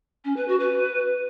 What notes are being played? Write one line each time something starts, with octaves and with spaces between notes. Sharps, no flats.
C#4
B4
F#4
B4